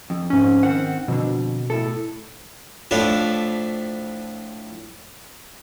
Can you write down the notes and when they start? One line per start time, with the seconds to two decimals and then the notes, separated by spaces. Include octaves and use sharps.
0.10 F2
0.30 G#2 C#4
0.63 D#3 C4 F#5
1.08 F2 B2 D3
1.70 A2 E4 A4
2.91 A2 F3 D4 E4